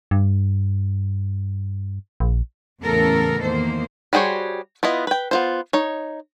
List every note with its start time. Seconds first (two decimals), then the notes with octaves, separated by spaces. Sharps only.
0.11 G2
2.20 A#1
2.83 E2 A2 C#3 B3 A4 A#4
3.42 E2 D#3 A#3 C5
4.13 G3 F#4 G#4 C5 C#5
4.83 B3 E4 F4 D#5
5.07 B4 G5
5.31 B3 F4 C5
5.73 D#4 C#5